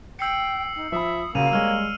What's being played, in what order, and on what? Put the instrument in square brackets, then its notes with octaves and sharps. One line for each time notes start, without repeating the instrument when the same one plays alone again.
[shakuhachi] G5 [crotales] E6 C7 C#7
[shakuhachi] D#4
[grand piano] F3 B5 [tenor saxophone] E5 [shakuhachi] D#6
[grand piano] C#3 F#4 [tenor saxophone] A#3 [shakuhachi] F4 [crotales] E6 D#7 F7
[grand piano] G3 G#3 [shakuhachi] C#5 [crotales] E6 F6